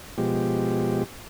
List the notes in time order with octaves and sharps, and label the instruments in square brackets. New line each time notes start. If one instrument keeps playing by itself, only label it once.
[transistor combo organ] B2 F3 G#3 G4